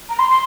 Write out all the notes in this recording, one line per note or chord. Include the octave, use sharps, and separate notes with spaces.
A#5
C6
C6